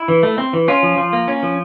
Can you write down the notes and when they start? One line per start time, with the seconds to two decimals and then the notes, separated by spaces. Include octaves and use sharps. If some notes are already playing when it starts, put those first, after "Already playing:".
Already playing: E4
0.08 E3
0.23 A3
0.38 C4
0.53 E3
0.68 C#4 F4
0.83 F3
0.97 F3
1.13 A#3
1.28 C#4
1.43 F3